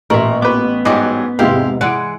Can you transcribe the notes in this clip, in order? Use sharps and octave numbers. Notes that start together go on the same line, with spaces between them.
A1 A#2 A#4 E5 C#6 F#7
B3 B4 D6
G#2 F#3 G3 D#5 D6
E2 G#2 C3 G#3 E4 G4 F5
E3 G#3 D5 F#5 D7